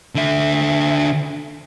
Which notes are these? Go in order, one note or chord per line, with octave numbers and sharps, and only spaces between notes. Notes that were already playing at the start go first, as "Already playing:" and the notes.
D3 E5